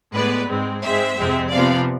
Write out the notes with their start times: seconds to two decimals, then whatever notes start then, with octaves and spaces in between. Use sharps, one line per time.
0.14 A2 G#3 B3 B4 D5
0.48 G#2 G#3 C4
0.83 G#2 G#3 C4 C5 E5
1.17 F2 C3 G#3 C4
1.51 C3 F3 B3 D5 F5